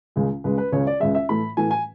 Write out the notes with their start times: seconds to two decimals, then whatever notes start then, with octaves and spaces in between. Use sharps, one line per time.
0.16 C#2 C#3 G#3
0.44 C#2 C#3 G#3 B4
0.58 B4
0.72 C#2 C#3 G#3 C#5
0.87 D5
1.00 C#2 C#3 G#3 E5
1.15 E5
1.29 A2 E3 A3 B5
1.57 A2 E3 A3 G#5
1.71 G#5